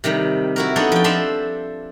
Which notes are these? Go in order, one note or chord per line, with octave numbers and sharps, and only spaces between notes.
C3 D#3 G3
E4 F#4 A#4
B3 D4 D#4 A4 C#5
F3 G5
D4 A4 C5 E5 F5 C6